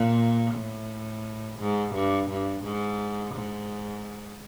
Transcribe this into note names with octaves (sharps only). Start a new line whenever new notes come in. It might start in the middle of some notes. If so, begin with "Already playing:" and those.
Already playing: A#2
A2
G#2
G2
G2
G#2
G#2